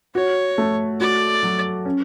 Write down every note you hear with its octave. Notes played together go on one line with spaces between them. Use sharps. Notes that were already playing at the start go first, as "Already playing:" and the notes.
F#4 C#5
A3
F#4 D5
F#3
C#4